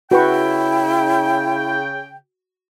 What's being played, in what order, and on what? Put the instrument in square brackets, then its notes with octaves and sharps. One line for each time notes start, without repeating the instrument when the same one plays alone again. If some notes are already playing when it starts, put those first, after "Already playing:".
[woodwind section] C#3 G5 [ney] E4 [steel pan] F#4 B4 C#6